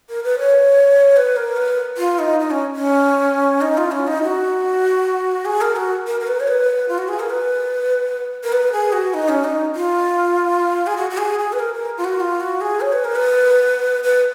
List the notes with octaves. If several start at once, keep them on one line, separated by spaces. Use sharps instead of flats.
A#4
B4
C#5
B4
A#4
B4
F4
D#4
D#4
C#4
C#4
D#4
F4
C#4
D#4
F#4
G#4
A#4
F#4
A#4
A#4
B4
C#5
B4
F4
F#4
G#4
A#4
B4
A#4
B4
G#4
F#4
D#4
C#4
D#4
F4
G#4
F#4
F#4
G#4
G#4
B4
A#4
A#4
F4
F#4
F4
F#4
G#4
C#5
B4
A#4
B4
B4